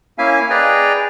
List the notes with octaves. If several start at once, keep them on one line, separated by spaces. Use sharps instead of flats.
A#3 C#4 E4 E5 F5 G#5
G#4 B4 D5 D#5 G5 A#5